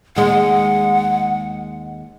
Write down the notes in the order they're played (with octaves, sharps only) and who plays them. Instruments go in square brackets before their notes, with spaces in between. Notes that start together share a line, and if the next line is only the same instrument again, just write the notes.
[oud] D#2 G#3 [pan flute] F#5